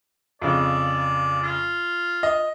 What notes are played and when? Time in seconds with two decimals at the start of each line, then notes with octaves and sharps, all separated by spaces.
0.42 F2 C#3 D5
1.43 F4
2.23 D#5